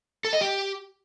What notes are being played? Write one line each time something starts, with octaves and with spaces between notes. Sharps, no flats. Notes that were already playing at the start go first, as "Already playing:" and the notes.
A4
D#5
G4